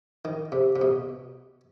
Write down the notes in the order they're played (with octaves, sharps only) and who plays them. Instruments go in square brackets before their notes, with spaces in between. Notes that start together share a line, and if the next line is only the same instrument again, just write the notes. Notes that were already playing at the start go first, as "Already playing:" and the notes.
[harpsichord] D#3
C3
C3
B2